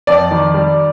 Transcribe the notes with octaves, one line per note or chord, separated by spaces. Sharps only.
F2 D5
D#3
G3